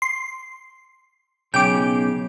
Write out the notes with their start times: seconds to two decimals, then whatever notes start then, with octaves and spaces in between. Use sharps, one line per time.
0.02 C6
1.54 B1 C#3 G4 G5 D6